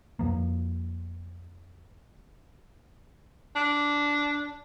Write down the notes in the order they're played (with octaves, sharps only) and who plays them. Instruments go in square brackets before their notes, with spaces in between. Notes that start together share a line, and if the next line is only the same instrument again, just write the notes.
[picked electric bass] F2 F3 A#3
[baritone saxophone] D4